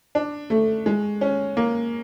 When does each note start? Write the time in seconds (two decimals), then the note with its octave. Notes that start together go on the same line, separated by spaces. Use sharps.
0.15 D4
0.50 A3
0.86 G#3
1.21 C#4
1.57 A#3